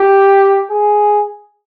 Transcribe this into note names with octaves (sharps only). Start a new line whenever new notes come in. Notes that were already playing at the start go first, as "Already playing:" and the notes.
Already playing: G4
G#4